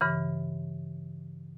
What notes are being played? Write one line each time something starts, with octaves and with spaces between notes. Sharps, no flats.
G2 C#3 E3